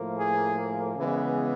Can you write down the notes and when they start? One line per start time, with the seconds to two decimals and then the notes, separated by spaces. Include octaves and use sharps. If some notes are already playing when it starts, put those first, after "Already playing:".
Already playing: A2 F3 A#3
0.17 G#4
0.96 C#3 E3 G#3 B3